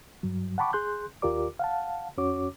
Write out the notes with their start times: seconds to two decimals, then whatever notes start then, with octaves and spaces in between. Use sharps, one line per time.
0.23 G2 F#3
0.58 F#5 G5 A5 B5 C#6 D6
0.73 G#4 C6 F#6 G6
1.22 D#2 F4 G4 A#4 D5 D6
1.59 F5 F#5 A5
2.17 F2 C#4 F#4 C#5 D6